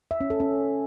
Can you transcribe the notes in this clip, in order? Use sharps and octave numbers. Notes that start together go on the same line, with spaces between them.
E5
C#4
A4
C#4